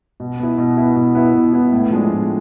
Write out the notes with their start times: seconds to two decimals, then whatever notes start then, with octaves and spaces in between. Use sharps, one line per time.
0.20 B2
0.40 B3 E4
0.58 B2
0.77 B3 E4
0.96 B2
1.15 B3 E4
1.35 B2
1.53 B3 E4
1.72 A2
1.91 F3 G#3 D4
2.10 A2